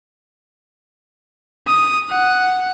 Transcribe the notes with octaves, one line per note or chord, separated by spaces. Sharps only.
D#6
F#5